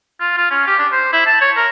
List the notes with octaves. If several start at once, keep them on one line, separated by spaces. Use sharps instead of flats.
F4
F4
C#4
G4
D4
C5
E4
A5
C#5
A#4